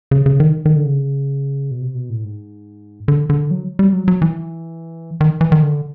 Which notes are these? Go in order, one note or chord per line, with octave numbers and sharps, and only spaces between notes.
C#3
C#3
D#3
D#3
D3
C#3
B2
C3
B2
A2
G#2
D3
D3
F#3
G3
F#3
F#3
E3
D#3
E3
D#3
D3